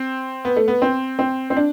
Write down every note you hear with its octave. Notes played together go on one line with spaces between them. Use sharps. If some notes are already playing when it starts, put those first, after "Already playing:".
Already playing: C4
B3
A3
B3
C4
C4
C4
D4